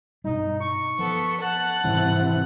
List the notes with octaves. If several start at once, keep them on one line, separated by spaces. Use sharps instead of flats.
G2 B2 G3 D#4
C#6
F3 B3 A4
F#5 A5 F#6
G#2 C3 D#3 E3 G3